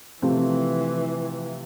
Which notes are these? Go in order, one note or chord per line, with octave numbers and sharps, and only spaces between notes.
C3 E3 F3 A3 C4